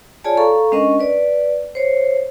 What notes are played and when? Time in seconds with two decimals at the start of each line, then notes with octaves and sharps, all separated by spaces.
0.24 F4 G#4 C#5 D5 G#5 A5
0.37 A4 F5 A#5 C#6
0.72 G#3 C#4 D4 A#4 D#5 C#6
1.00 B4 D5
1.75 C5 C#5